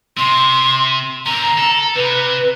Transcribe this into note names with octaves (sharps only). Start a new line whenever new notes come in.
C3 C6
D3 C4 A#5
A4
C3 B4